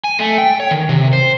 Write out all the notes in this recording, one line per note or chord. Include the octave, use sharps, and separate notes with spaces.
G#5
A3
G5
C#5
D#3
C3
C5